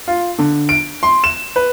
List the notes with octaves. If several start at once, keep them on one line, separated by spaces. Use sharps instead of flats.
F4
D3
D7
C6
E7
B4